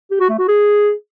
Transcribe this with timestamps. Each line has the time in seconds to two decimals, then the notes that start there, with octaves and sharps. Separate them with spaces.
0.11 G4
0.20 F#4
0.30 A3
0.39 F#4
0.48 G#4